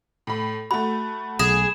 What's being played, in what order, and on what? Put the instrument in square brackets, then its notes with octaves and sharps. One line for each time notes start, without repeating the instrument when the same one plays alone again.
[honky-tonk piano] A2 B5
[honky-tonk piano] A3 F#4 [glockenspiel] B5
[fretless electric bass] B1 [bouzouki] G#4 [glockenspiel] E7